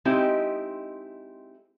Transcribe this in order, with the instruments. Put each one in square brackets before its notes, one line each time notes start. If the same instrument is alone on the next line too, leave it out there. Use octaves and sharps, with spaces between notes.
[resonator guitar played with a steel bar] G#3 C4 D#4 E4 G4 D#5